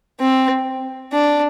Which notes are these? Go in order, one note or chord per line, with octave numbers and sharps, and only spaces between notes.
C4
D4